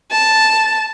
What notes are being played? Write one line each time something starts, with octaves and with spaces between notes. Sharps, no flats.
A5